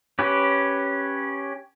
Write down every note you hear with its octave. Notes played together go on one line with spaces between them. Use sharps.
C#4 G4 B4